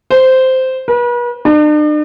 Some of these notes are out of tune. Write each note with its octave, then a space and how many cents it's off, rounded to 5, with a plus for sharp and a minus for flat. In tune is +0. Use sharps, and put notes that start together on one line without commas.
C5 -10
B4 -40
D4 +45